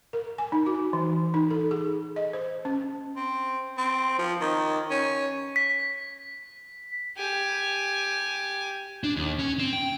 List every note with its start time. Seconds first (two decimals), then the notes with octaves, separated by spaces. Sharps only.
0.13 A#4
0.38 G#5
0.52 D#4
0.66 F#4
0.93 E3
1.34 D#4
1.50 A4
1.71 G#4
2.16 D#5
2.33 C5
2.65 C#4
3.16 C4
3.78 C4
4.19 F3
4.41 D#3
4.91 C#4
5.56 B6
7.17 G4 G#5
9.04 D4
9.17 D#2
9.39 C#4
9.59 C4
9.73 G5